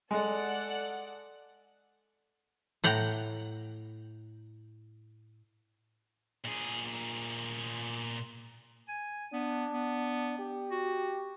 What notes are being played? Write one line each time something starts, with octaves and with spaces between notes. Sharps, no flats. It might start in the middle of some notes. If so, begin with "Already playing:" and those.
G#3 A4 D5 F#5
A2 F#5 G5 A#5
A#2 G#4
G#5
B3 D4
B3
G4
F#4